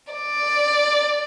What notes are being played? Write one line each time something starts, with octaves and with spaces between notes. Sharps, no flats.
D5